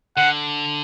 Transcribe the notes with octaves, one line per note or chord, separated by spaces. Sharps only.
D3 F#5